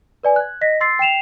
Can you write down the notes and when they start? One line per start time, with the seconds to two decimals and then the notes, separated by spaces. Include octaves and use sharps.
0.23 B4 D5 G#5
0.36 F#6 G#6
0.61 D#5 A#6 B6
0.81 C6 E6 A6 C7
0.99 G5 C7 E7 F7